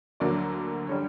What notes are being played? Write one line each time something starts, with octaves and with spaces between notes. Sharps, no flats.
D2 D3 F#3 A#3 D5
D3 G3 C#5